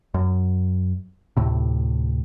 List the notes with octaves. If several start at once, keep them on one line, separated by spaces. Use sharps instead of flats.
F#2
D2 A2 C3